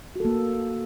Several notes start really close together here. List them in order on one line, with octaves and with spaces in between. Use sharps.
F#4 A4 A#3